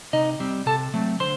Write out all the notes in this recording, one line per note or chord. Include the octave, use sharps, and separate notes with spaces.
C3 D#4 D#5
G3 C4
C3 A4 A5
F#3 A3 C4
D3 C5 C6